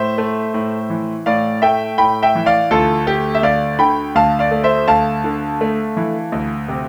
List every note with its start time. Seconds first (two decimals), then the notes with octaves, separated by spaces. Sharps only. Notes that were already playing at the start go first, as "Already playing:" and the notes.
Already playing: A2 C5 E5
0.18 A3
0.54 A2
0.90 E3
1.26 A2 D5 F5
1.62 A3 E5 G5
1.98 A2 G5 B5
2.23 E5 G5
2.35 E3
2.46 D5 F5
2.71 D2 F4 A4
3.07 A3 G4
3.35 E5
3.43 D2 D5 F5
3.79 D3 G5 B5
4.15 D2 F5 A5
4.39 D5 F5
4.51 A3
4.64 C5 E5
4.88 D2 F5 A5
5.24 D3
5.61 A3
5.97 E3
6.32 D2
6.68 C3